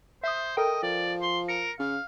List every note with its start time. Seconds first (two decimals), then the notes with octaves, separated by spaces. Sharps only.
0.24 C5 E5 D#6
0.57 A4 A#4 D#5 G5
0.83 F3 D5
1.21 C6
1.49 A#4 C#7
1.79 C#3 F5